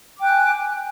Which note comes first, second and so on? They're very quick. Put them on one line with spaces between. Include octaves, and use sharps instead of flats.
D6 G5 F#6 G#5